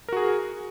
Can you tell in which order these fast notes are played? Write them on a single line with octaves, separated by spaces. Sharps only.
A#4 F#4 G#4